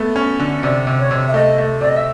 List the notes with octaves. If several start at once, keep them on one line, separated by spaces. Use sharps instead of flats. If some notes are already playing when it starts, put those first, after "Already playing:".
Already playing: A3 B3
C#4
D3
C3 D5
C3
C#5
C3
E5
A3 D#5
A3
C3 D5
D#5
E5